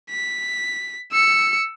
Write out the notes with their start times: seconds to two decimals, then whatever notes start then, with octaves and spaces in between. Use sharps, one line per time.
0.10 B6
1.12 E6 C#7